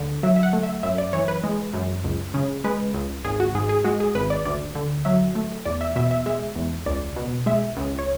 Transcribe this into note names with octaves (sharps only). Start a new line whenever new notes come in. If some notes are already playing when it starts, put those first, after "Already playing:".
Already playing: D2 D3
F#3 E5
E5
F#5
A3
E5
F#2 E5
D5
E3 C#5
B4
G#3
F#2
C#2
C#3
G#3 B4
C#2
G#1 G#4
F#4
G#2 G#4
G#4
G#3 F#4
G#4
G#1 B4
D5
D2 D5
D3
F#3 E5
A3
E2 D5
E5
B2 E5
E5
G#3 E5
E2
C#2 D5
B2
G#3 E5
C#2
C#5